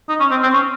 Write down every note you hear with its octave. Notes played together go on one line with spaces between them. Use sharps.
D#4
C#4
C4
C4
C#4